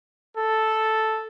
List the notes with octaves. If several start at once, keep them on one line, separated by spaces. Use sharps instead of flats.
A4